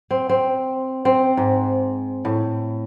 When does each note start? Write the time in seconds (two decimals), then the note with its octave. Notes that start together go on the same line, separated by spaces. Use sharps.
0.11 C4
0.29 C4
1.05 C4
1.37 G#2
2.25 A2